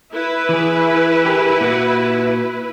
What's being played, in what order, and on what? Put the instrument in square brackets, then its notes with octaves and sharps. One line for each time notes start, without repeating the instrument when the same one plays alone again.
[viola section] E4 B4
[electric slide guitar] E3 G#4
G4 G#4 A#4
A#2 F#4